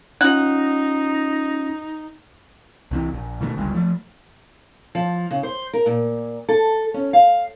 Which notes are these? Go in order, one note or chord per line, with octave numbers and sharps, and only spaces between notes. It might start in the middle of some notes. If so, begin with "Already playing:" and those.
C#4 D#4 F4 F#5
C2 C3 E3
A#1
B2 D#3 F#3 A3
G1 C#2 G2
F3 A3
F3
C#3
C5
A#4
A#2
A4
C#4
F5